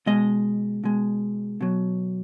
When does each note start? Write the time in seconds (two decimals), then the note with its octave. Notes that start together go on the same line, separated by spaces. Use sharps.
0.06 B2 G#3 D#5
0.84 B2 G#3
1.61 B2 F#3